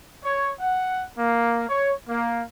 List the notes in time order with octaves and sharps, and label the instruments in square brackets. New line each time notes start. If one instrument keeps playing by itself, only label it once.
[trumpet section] C#5
F#5
A#3
C#5
A#3